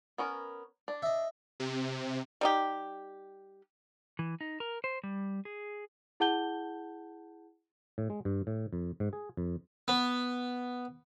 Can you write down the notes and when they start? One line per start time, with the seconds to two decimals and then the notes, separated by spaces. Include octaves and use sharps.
0.18 B3 C#4 A#4
0.88 D4
1.02 D#5 E5
1.60 C3
2.41 G3 D#4 G4
4.19 E3
4.41 D#4
4.60 A#4
4.84 C5
5.04 G3
5.45 G#4
6.20 E4 G#4 F#5 A5 G6 G7
7.98 A2
8.10 G#3
8.25 G2
8.47 A2
8.73 F2
9.00 G#2
9.13 G#4
9.37 F2
9.88 B3